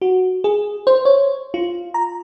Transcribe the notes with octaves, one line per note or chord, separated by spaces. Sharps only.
F#4
G#4
C5
C#5
F4
A#5